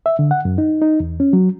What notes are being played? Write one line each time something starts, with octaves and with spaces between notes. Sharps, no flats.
E5
D3
F#5
F#2
D#4
D#4
E2
C#4
F#3